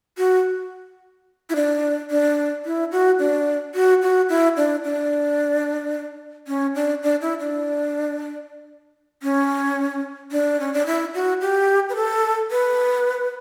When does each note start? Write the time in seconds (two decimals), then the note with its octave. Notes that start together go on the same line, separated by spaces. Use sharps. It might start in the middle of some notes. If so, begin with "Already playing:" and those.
0.18 F#4
1.50 E4
1.56 D4
2.11 D4
2.65 E4
2.92 F#4
3.19 D4
3.75 F#4
4.02 F#4
4.29 E4
4.57 D4
4.84 D4
6.48 C#4
6.75 D4
7.03 D4
7.21 E4
7.40 D4
9.23 C#4
10.32 D4
10.60 C#4
10.74 D4
10.86 E4
11.14 F#4
11.41 G4
11.89 B4
11.96 A4
12.51 B4